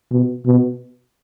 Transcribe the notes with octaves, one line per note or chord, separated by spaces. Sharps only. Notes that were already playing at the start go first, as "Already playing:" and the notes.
B2
B2